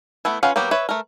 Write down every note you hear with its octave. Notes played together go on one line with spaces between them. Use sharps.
A3 B3 E4
C#4 F4 B4 F5 F#5
F#3 A#3 B3 G4
B4 C#5 E5
A3 A#4